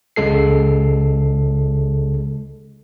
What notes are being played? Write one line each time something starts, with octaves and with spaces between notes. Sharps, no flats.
C#2 C#3 G#3 A4 C7